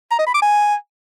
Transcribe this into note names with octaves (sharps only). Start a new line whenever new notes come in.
A#5
D#5
B5
D6
G#5